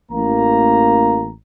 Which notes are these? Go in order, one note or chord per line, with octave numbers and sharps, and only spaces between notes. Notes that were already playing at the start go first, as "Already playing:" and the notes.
A1 A#3 A#5